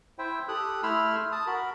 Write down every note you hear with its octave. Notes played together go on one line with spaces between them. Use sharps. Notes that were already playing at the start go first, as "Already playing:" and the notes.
E4 C5 E5 G5
G4 A4 D#6 F#6
A3 E4 B5 C6 E6 F6
A5 D#6
F#4 A#4 B5